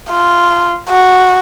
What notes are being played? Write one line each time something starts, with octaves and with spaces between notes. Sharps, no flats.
F4
F#4